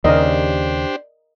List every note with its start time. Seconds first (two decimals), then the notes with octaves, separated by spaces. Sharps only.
0.04 D#2 C#3 D4 G4 A#4 C5 D5 D#5